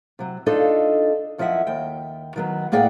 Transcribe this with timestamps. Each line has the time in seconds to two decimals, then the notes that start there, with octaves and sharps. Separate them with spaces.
0.19 C3 F#3
0.46 D4 D#4 F4 A4 D#5
1.38 F#2 F3 E4 D#5 E5 F#5
1.67 D#2 G5
2.36 D#3 F#3 B3
2.72 A2 A#3 G#4 D5 F#5 G5